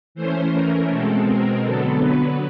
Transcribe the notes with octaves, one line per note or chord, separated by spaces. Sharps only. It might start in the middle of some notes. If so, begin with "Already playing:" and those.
E3 A3 C#4 C5
A#4
B2 G#3 C4 A4
A#4
D3 F#3 B3 A4
B4